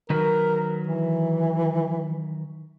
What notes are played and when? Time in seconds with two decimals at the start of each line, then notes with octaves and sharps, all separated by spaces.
0.10 D#3 F#3 A#4 B4
0.87 E3